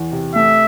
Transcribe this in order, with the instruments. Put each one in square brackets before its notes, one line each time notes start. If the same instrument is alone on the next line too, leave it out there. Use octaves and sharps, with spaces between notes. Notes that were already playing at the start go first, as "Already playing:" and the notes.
Already playing: [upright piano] E2
C3
[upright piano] A3 [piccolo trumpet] E5